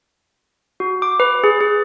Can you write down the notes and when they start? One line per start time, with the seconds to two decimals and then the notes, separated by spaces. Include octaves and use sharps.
0.80 F#4
1.02 D6
1.20 B4
1.44 G#4
1.61 G#4